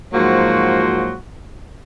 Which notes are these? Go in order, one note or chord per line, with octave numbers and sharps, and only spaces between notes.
G#2 F3 F#3 A#3 F#4 C5